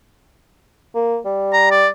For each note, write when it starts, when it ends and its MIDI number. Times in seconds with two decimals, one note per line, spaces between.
0.95 1.18 58
1.25 1.86 55
1.53 1.68 82
1.71 1.88 74